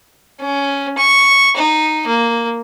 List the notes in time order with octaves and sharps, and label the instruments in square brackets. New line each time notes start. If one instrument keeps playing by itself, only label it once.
[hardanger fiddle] C#4
C#6
D#4
A#3